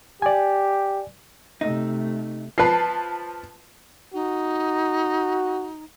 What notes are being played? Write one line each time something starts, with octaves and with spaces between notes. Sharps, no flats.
G4 D5 G#5
C3 A3 D#4
F3 B4 A5 C7
D#4 F#4